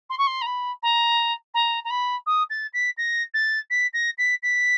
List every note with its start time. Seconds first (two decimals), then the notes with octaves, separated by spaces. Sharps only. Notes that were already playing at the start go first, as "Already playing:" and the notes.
0.09 C6
0.18 C#6
0.27 C6
0.41 A#5
0.46 B5
0.82 A#5
1.54 A#5
1.84 A#5
1.90 B5
2.26 D#6
2.50 A6
2.73 B6
2.97 A#6
3.34 A6
3.70 B6
3.93 A#6
4.18 B6
4.42 B6